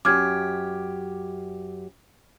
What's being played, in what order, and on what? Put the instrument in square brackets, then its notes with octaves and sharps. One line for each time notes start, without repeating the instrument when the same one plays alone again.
[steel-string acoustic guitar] F#2 G4 [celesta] D6 F6 G#6